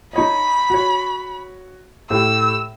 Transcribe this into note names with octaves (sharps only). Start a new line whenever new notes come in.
D#4 C#5 D#5 B5
F#4 C#5
A2 G4 E6